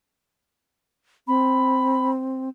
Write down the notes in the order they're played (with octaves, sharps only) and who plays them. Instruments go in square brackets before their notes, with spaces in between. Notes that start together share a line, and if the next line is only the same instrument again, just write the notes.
[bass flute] C4 [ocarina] B5